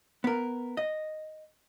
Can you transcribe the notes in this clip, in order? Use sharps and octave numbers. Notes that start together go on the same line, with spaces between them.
B3 A#4
D#5